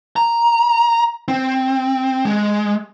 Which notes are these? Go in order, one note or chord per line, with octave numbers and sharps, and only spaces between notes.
A#5
C4
G#3